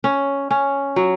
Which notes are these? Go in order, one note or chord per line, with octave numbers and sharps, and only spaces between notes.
C#4
C#4
F#3